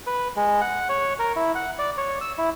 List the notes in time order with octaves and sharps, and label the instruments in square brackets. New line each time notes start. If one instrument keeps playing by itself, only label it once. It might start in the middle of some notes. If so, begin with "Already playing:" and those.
[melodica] B4
G#3
F#5
C#5
A#4
E4
F#5
D5
C#5
E6
E4